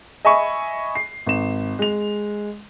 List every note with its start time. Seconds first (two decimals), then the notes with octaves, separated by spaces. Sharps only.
0.25 D#5 E5 G#5 B5 C#6
0.95 C7
1.26 G#1 E7
1.79 G#3 F7